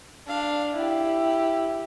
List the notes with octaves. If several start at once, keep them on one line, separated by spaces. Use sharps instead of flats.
D4 F5
E4 G4